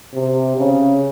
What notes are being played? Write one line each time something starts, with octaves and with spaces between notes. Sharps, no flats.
C3
C#3